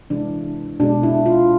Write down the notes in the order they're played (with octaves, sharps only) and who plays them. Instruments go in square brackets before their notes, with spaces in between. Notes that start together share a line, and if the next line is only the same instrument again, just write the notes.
[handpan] C3 E3 G#3 D4
B2 D4
G#3
E4
F4